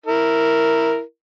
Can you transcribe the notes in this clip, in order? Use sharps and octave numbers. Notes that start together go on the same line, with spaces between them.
E4 A#4